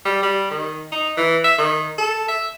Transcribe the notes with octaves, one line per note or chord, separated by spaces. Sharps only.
G3
G3
D#3
D#4
E3
E5
D#3
A4
E5